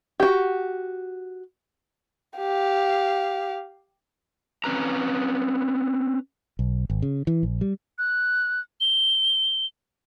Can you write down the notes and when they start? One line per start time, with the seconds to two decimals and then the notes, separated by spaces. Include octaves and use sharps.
0.20 F#4 G4
2.37 G4 F5
4.64 C4 C#4 B4 A#5
6.59 B1
6.90 G#1
7.02 C#3
7.27 E3
7.43 A#1
7.61 G3
7.98 F#6
8.81 G7